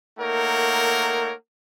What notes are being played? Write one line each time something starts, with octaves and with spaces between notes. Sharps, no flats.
A3 A#3 D#4 A#4 C#5 F#5